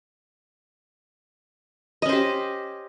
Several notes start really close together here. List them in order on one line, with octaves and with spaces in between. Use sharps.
D#5 C#4 C5 G4